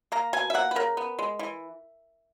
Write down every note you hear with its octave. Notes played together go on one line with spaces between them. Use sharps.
A#3 A#5
B2 G#5
E5
A#3 F#5
B4
C#3 A#4
B3
G#3
E3